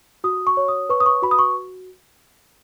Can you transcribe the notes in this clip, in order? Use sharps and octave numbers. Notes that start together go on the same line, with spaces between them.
F#4 D#6
C#6
C#5
D#6
B4 C#6
D#6
C#6
F#4 B5
D#6
C#6